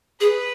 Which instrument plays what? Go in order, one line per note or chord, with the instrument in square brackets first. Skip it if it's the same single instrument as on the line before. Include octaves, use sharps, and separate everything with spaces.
[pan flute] G#4 [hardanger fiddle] B4